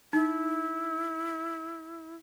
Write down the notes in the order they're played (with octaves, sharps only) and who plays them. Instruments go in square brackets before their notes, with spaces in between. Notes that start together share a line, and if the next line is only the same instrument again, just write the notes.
[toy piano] D#4 [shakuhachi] E4